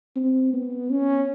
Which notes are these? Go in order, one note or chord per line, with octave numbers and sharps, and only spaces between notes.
C4
B3
C#4